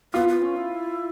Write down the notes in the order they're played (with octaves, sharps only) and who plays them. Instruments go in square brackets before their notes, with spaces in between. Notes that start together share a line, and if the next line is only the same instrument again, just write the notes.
[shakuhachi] B3 [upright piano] F4
[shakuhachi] B3
C#4
E4